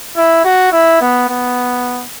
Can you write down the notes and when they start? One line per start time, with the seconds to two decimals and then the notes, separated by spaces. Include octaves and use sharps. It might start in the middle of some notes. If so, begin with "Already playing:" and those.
0.17 E4
0.44 F#4
0.72 E4
1.01 B3
1.29 B3